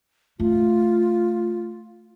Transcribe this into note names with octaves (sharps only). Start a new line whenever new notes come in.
A3 F4